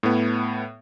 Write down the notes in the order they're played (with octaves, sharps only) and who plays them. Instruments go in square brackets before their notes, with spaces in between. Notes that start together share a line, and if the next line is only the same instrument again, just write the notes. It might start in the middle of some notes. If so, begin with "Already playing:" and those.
[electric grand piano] A2 B3